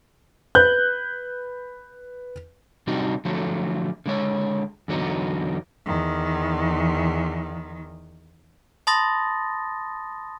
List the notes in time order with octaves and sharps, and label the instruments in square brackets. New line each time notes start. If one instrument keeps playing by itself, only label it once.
[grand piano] B4 F#6 G6
[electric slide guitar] C3 G3 C4 D4 D#4 F#4
D3 F3 F#3 A3
D3 G#3 C#5
E2 D3 F#3 B3 D#4
[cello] E2 D#3
[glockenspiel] A5 B5 C6 D#6 A6 A#6